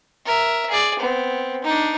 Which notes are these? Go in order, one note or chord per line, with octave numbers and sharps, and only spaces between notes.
A#4 E5
G#4 D5
B3 C4
D4 D#4